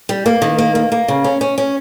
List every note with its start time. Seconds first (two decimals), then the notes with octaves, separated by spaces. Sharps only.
0.09 G3
0.26 A#3
0.42 D#3
0.58 A#3
0.75 A#3
0.92 A#3
1.08 C#3
1.24 C#4
1.41 C#4
1.58 C#4